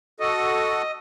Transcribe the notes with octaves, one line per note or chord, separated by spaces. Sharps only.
F#4 A4 D#5